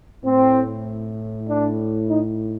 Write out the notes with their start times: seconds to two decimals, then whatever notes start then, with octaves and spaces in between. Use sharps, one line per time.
0.24 A2 C4
1.48 D4
2.09 D#4